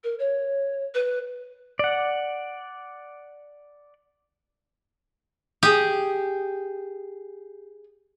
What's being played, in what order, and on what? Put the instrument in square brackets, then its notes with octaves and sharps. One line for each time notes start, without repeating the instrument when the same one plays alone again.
[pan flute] A#4
C#5
B4
[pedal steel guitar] D5 F#5
[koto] G4 [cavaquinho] G#4 D#6